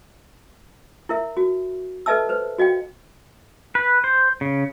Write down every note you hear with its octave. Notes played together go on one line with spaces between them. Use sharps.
E4 A#4 E5
F#4
A4 B4 D#5 E5 A5 E6
B4 C5
F#4 D#5 F5 G5
B4
C5
C#3